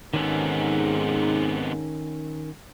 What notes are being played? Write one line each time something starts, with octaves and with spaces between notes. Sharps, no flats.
G#2 C3 D#3 B3 C#4 A4